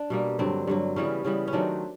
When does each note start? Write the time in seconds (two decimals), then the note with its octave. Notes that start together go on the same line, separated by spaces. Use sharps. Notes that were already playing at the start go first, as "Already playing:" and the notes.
Already playing: D4
0.10 B2 G3 A#3
0.39 G2 D3 F#3 C4
0.67 G2 D3 F#3
0.96 C#3 E3 G3 B3 C#4
1.24 C#3 E3 G3 B3
1.48 C#4
1.53 D#3 F#3 A3 C4 D4